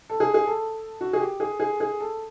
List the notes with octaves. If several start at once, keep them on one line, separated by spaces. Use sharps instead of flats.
A4
G#4
G#4
A4
F#4
G#4
G4
G#4
G#4
G#4
A4